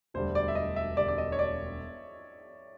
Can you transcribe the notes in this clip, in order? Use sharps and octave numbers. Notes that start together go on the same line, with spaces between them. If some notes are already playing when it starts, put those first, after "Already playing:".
E1 D2 D3 G3 C5
D5
E5
D#5
E5
E1 D2 D3 G3 D5
D5
D#5
C#5
D5